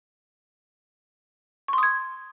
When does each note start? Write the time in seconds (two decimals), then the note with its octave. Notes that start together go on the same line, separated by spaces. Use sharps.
1.68 C#6
1.73 C6
1.78 D#6
1.83 G#6